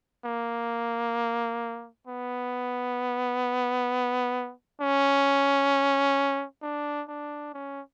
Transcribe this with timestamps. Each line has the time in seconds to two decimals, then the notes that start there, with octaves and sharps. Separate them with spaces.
0.25 A#3
2.07 B3
4.81 C#4
6.62 D4
7.08 D4
7.54 C#4